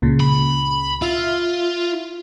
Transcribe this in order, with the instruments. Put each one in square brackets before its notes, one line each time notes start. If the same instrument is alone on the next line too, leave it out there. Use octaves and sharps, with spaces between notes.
[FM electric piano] C#2 A#2 C#3
[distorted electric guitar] B5
[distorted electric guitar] F4 [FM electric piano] E5